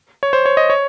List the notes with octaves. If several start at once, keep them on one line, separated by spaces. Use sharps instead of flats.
C#5
C5
C#5
D#5
C#5